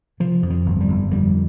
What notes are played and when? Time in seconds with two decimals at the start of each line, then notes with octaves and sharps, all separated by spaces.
0.20 C3 F3
0.43 F2
0.50 F3
0.66 G1
0.81 G3
0.88 G1
1.11 F2 G3